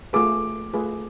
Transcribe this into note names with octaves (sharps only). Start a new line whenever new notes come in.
A3 F4 G#4 B4 D6
A3 F4 G#4 B4